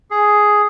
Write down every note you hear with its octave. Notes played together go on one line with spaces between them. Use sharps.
G#4